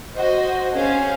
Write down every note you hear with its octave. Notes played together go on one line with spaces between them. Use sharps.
F#4 C5 D#5
C#4 G#4 C5 F5